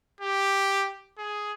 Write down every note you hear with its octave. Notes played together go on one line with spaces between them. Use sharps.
G4
G#4